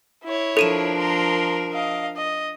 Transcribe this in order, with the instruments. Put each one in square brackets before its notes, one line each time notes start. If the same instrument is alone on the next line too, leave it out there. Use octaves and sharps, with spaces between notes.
[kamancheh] E4 C#5
[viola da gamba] F3 D4 A#4 [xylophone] A4 D#7 E7
[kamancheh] A#5 C6
D#5 F5
D#5